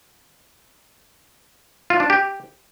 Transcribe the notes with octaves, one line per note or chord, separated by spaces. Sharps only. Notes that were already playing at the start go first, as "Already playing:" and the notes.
F4
D4
G4